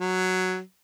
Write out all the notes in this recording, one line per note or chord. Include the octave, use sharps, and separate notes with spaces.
F#3